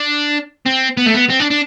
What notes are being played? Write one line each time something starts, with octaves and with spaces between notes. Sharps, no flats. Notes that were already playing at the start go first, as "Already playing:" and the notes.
Already playing: D4
C4
B3
A3
B3
C4
D4
D4